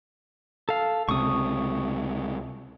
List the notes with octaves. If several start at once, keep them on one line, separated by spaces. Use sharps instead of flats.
A4 F5
C#2 C3 C#6 D#6